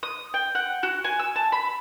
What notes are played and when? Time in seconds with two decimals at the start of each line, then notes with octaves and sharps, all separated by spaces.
0.03 D#6
0.34 G5
0.55 F#5
0.83 F#4
1.04 G#5
1.19 E6
1.36 A5
1.52 B5